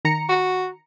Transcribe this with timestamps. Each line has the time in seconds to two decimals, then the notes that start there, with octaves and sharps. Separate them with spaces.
0.05 D#3 A#5 C#7
0.29 F#4